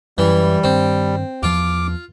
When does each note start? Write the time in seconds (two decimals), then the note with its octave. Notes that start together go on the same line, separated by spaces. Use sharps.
0.18 F#2 E3 G3
0.64 G2 D#3 C4
1.43 E2 F3 F4 D6